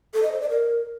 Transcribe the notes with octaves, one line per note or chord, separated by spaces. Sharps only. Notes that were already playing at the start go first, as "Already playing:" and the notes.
A4
D#5
C5
D5
A#4